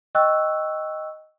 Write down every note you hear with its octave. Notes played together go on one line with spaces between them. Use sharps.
D#5 G5 C#6 E6 F#6